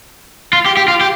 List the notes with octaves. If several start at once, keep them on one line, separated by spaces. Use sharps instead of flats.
F4
G4
G4
F4
G4